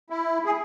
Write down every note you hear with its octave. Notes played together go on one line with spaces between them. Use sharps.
E4
G#4